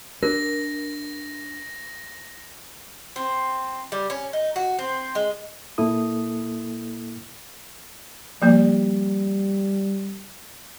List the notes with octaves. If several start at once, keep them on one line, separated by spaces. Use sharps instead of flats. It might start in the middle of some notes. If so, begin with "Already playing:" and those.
D4 A#4 A#6
C4
G3
C#4
D#4
F#4
C4
G#3
A#2 A#3 E4 A4 D#6
F3 G3 A#3 D5